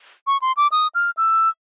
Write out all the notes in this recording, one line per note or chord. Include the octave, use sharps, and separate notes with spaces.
C#6
C6
D6
D#6
F6
E6